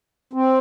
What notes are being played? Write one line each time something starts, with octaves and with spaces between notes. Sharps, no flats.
C4